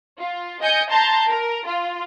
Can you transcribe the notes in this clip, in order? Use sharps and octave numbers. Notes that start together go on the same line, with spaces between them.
F4
D#5 G#5 G6 C#7
A5 A#5 C6 G6
A#4
F4